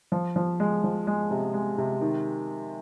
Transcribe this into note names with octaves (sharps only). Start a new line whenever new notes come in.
F3
F3
G#3
F3
G#3
C3
G#3
C3
D#3